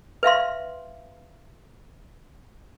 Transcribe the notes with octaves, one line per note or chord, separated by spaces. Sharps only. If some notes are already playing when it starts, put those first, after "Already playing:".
B4 E5 F5 C6